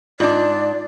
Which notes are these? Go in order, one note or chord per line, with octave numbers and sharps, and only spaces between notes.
G#2 D4 F4 D5